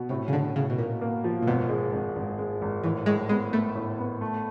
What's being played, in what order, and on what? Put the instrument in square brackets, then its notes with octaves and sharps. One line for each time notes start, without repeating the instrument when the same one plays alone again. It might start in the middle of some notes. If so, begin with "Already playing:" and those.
Already playing: [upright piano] B2
[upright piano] A2 [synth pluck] C3
[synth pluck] C#3
[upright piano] A2 [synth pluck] D3
[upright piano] A2 [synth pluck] C#3
[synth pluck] B2
[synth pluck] A#2 [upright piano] A#3
[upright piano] A#3
F3
[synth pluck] A#2
[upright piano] G#1 [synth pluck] B2
[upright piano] G#3
G#1
G#1
G#3
G#1
[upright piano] A2 [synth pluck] E3
[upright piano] A2 [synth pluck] G#3
[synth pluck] G#3 [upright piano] B3
[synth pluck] A3 [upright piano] B3
[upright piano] A2
B3
A3